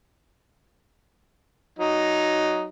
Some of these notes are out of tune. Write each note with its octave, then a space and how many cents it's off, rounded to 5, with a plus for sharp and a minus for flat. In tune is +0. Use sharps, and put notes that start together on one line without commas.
F#3 +10 D#4 +0